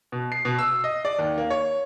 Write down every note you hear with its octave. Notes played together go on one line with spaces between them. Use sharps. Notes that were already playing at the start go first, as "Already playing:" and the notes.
B2
C7
B2
E6
D#5
D5
D#2
A#3
C#5